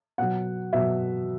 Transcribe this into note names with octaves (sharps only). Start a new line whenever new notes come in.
B2 F#3 F#5
B2 F#3 E5